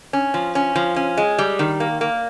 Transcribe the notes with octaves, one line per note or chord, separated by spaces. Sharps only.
C#4
F3
C#4
F3
C#4
G#3
G3
D#3
A#3
A#3